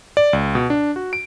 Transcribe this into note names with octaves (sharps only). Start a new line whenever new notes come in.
D5
C#2
B2
D4
F#4
D7